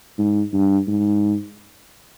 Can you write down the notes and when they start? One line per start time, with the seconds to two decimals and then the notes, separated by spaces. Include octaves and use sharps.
0.19 G#2
0.54 G2
0.88 G#2